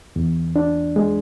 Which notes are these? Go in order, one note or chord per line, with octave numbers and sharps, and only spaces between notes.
E2
D4
G#3